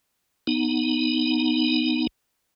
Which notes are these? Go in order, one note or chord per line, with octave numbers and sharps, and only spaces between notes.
B3 D#4